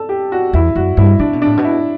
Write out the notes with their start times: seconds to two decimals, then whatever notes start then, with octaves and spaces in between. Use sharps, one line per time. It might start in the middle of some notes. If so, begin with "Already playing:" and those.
Already playing: A4
0.09 G4
0.32 F#4
0.53 E2 E4
0.76 F#2 F#4
0.97 G2 E4
1.19 C3 D4
1.33 B2
1.42 A2 D4
1.57 B2
1.65 E4